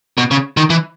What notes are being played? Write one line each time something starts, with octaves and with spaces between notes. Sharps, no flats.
B2
C#3
D#3
E3